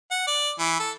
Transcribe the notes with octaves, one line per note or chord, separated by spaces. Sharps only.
F#5
D5
E3
A4